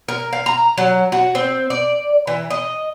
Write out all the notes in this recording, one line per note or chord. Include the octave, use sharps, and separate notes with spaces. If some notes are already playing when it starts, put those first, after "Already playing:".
A#4
F5
A#5
F#3
F#4
C4
D5
E3
D#5